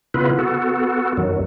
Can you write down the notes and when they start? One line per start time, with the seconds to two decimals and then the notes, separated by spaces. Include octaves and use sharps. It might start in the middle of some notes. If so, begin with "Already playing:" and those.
0.14 C#3 B3 E4 F4 B4
0.39 B3 F#4 A4
1.17 F#2 D#3 F#3